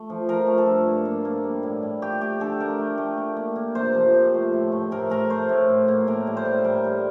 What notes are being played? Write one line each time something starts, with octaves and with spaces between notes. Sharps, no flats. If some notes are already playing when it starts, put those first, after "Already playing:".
Already playing: A3
F3
F3 A#4
A3
A4
G2
A#3
A#3
A#3
G3
A2
G3
A3 G4
A3 G4
D3 A4
A3 A#4
A3
A3
A#3
A#3
A#3
C3 C5
F3
C3
A3
A2
A3
A2 A#4
A3 A#4
A3 C5
A2
A2
A#3
A2 A#4
G3
C5
A2
G3 A#4
G3